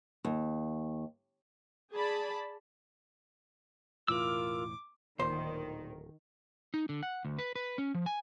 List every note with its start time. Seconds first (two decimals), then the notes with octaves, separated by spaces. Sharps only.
0.25 D#2
1.92 G#4 D5 A5 B5
4.08 E1 A2 E3 F4 A#4 D6 E6
5.19 D1 A#2 D#3 C5
6.74 D#4
6.89 D3
7.03 F#5
7.25 D2
7.39 B4
7.55 B4
7.78 C#4
7.94 F3
8.06 G#5